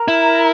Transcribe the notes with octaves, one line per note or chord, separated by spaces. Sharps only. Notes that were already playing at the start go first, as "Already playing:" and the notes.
Already playing: A#4 A#5
E4